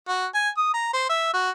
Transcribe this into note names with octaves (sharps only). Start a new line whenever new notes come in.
F#4
G#5
D#6
A#5
C5
E5
F#4